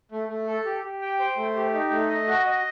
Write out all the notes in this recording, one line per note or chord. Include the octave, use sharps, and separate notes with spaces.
A3
A3
A4
G4
G4
G5
C5
A3
G4
D#4
A3
D#5
F#4
D#5